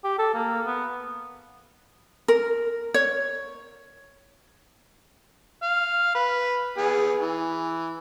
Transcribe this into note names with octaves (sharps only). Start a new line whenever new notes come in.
G4
A4
A#3
B3
A#4
C#5
F5
B4
B3 G#4
E3